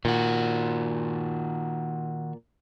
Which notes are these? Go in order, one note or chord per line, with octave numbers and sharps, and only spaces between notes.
A#2 D#3 F#4